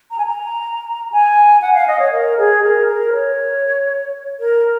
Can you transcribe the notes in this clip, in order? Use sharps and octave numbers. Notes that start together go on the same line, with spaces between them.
A#5
G#5
A#5
G#5
F#5
F5
D#5
C#5
A#4
G#4
A#4
A#4
C#5
A#4